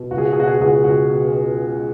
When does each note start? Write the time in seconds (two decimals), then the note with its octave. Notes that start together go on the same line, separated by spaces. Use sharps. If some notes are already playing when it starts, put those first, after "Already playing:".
Already playing: B2
0.11 C#2 F#4
0.18 G#4
0.25 F#4
0.33 G#4
0.36 B2 F#4
0.48 G#4
0.55 F#4
0.60 C#2 G#4
0.69 F#4
0.84 C#2 F#4
1.09 B2